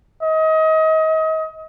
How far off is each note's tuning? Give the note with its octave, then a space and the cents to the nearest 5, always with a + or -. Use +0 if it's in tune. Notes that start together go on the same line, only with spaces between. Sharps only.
D#5 +30